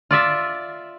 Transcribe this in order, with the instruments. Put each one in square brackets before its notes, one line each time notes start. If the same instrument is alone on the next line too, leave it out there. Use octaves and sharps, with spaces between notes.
[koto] F4 D5 E5